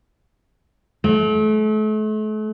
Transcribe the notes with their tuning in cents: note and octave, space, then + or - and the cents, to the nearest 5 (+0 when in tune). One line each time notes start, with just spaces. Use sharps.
A3 -40